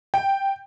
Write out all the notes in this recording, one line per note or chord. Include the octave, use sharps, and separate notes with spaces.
G5